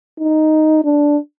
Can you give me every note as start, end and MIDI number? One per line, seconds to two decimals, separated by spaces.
0.20 0.82 63
0.84 1.17 62